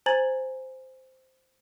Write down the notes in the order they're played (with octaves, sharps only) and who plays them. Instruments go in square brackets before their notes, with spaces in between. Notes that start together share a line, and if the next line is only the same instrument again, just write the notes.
[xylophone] C5 G#5 A#5 G#6 A6 F#7